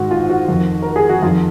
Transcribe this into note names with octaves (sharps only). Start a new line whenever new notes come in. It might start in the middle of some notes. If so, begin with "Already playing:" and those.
Already playing: G#2 D#3 F#4
F4
F#4
F2 D#3
A#4
G#4
F#4
F2 D#3 F4